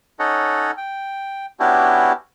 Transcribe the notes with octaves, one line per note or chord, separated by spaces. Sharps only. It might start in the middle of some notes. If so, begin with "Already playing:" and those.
C#4 D#4 A4 C#5 D#5 F#5
G5
B3 C#4 D4 E4 F#4 G4